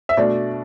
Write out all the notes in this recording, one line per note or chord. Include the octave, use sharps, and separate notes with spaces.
E5
B2 A3 D4 D5